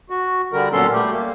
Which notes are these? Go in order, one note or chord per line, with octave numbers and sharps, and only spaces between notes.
F#4
D3 G3 A#4
A#2 F#3 B3 C#4 A4 C6
G3 A3 G4
A#3